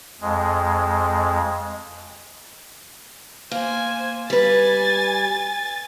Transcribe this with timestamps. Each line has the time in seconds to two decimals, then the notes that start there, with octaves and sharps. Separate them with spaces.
0.21 F2 G#3
3.51 A#3 C5 G#5
4.30 G3 B4 G#5 A6